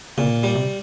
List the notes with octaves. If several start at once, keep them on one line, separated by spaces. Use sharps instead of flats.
A#2 C#3
G3
C3